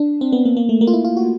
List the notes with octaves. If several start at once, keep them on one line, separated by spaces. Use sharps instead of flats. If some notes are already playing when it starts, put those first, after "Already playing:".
Already playing: D4
C4
B3
A#3
A#3
A3
A#3
F4
E4
F4
F#4